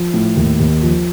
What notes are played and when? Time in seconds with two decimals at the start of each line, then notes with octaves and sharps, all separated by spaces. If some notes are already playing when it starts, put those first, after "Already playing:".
Already playing: F3
0.14 A2
0.37 D#2
0.60 D#2
0.82 F3